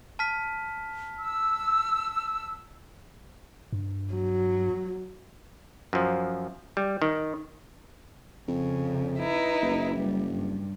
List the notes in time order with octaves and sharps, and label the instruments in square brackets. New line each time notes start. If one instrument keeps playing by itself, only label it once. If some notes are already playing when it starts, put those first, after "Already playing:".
[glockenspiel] A5 F6 B6
[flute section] E6
[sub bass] G2
[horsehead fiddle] F#3
[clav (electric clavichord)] F#2 F3
G3
D#3
[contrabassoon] F2 [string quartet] C#3
[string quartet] D#4 E4 B4
[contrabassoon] F#1
[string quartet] G3
G2